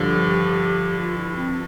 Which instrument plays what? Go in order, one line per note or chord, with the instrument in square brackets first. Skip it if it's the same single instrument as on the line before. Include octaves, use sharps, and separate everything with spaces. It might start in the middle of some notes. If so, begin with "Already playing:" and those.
Already playing: [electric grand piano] G2 D3 F3 [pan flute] G4
[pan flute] F4
E4
C4